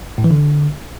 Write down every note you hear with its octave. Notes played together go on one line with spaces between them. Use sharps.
A2
E3
D3